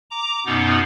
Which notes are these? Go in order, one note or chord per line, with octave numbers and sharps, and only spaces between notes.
A#5 D6
F#2 B2 B3 D#4